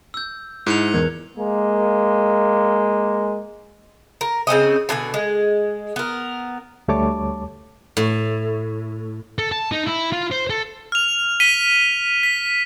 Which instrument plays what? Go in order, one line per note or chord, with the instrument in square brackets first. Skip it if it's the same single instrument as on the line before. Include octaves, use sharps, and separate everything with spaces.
[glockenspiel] E6 G6
[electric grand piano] G#2 [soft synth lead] E4 [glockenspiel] F#6 C#7 F7
[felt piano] E2 [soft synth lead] A#4 [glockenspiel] G#6
[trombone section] G#3 A#3
[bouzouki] A#4
C#3 C4 C#4 D#5
B2 D3 D4 G#5
G#3
B3 A#4
[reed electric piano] D2 G3 A3 C#5 A5 D6
[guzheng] A2
[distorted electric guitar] A4
A5
D#4
E4
F4
C5
A4
[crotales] F6 F7
B6 D#7 G7
B6